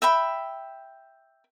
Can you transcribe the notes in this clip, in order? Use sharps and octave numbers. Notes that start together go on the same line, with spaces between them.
E5 G5 B5